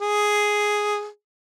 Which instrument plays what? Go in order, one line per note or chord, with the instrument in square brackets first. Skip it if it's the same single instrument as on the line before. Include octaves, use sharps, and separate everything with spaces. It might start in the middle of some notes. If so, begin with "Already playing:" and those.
[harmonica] G#4